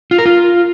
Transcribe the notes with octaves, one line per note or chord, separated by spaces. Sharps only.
F4
A#4
F4